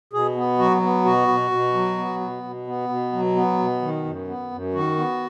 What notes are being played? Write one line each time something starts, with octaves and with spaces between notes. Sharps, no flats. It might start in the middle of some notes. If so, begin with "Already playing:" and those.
B2 G#4
B3
F#3 F#4
B3
B2 F#4
B2
B2
F#3
B3
B2
B2
B3
B2
F#3
B3
B2
D#3
F#2
B3
F#2
D#3 F#4
B3